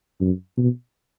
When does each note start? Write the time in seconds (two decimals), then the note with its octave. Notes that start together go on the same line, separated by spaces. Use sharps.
0.21 F#2
0.57 B2